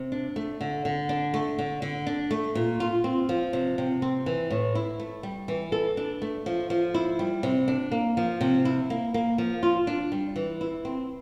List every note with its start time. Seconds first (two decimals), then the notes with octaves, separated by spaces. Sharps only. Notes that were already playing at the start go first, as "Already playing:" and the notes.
Already playing: C3
0.12 D4
0.36 A3
0.61 D3
0.85 D3
1.09 D4
1.34 A3
1.59 D3
1.82 D3
2.07 D4
2.31 A3
2.55 A#2
2.80 F4
3.04 C4
3.29 F3
3.53 C3
3.78 C3
4.02 C4
4.26 E3
4.51 A2
4.75 E4
5.00 A3
5.23 G3
5.48 E3
5.72 A4
5.97 D4
6.22 A3
6.46 F3
6.70 F3
6.94 E4
7.19 G3
7.43 C3
7.68 D4
7.92 A#3
8.17 F3
8.41 C3
8.65 E4
8.90 A#3
9.14 A#3
9.38 F3
9.63 F4
9.87 D4
10.12 G3
10.36 E3
10.61 E4
10.85 C4